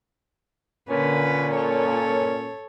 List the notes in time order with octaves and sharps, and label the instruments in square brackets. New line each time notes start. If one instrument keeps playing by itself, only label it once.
[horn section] A#2 C#4 [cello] D3 B4
[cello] A4 C#5